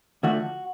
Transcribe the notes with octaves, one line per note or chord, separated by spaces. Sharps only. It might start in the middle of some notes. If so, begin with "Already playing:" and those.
D2 D3 F3 A3 F#4